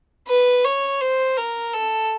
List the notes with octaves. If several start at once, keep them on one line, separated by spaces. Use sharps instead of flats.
B4
C#5
C5
A#4
A4